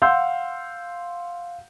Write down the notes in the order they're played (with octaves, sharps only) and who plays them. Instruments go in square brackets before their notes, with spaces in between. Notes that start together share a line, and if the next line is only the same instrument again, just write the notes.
[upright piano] F5 F#5 C6 E6 G6